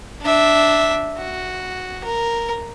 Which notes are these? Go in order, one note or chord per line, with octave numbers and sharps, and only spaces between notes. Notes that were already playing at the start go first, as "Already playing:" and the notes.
D4 E5
F#4
A#4